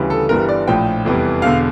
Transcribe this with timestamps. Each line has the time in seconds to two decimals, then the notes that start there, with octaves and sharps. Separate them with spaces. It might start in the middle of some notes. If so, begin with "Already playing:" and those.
Already playing: D2 C#3 E3 G3
0.10 A4
0.29 G1 G2 E3 G3 A#4
0.49 D5
0.67 A#1 A2 F3 G5
1.05 F1 E2 E3 G3
1.42 E1 E2 D3 F5